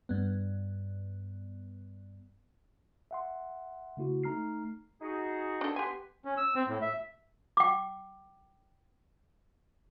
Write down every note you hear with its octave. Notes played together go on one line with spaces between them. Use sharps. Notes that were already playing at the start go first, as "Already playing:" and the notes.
G2 B3
E5 F#5 C6
C#3 A3 E4 F#4
A3 D#4 A#5 F6 C7
D#4 F#4 G#4
D4 A4
B3 G4 B4 G#5 C6
C#4
E6
C4
A2
E5
G5 D6